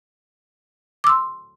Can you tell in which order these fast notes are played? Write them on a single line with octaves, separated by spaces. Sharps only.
D6 E6 C6